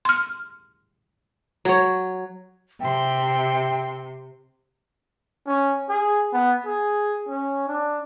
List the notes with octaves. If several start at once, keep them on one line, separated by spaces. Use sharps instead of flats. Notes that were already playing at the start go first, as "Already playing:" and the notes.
C6 F6
F#3 C#5
C3 E5 G5 C6
C#4
G#4
B3
G#4
C#4
D4